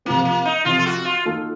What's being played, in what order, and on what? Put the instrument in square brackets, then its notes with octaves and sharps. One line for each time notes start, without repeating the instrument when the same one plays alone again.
[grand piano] C3 F3 C4 [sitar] A#3
[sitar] A#3
D#4
[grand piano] C3 F3 C4 [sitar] F4
[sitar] A4
F#4
F4
[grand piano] D#3 A#3 F4 A4